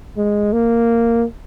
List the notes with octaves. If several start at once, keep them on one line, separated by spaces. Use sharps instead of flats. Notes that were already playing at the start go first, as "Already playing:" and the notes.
G#3
A#3